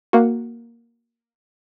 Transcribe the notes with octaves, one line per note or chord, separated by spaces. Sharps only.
A#3 F#4